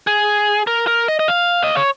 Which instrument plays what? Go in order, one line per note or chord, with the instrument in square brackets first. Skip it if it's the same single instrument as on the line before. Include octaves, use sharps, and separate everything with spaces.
[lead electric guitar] G#4
A#4
A#4
D#5
D#5
F5
D#5
C#5